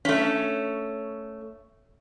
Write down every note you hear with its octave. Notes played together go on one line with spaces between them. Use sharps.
A3 C#4